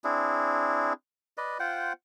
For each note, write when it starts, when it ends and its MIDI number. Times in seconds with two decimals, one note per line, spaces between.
0.04 0.93 60
0.04 0.93 62
0.04 0.93 64
0.04 0.93 68
1.37 1.58 71
1.37 1.58 74
1.37 1.58 75
1.60 1.93 65
1.60 1.93 72
1.60 1.93 78
1.60 1.93 79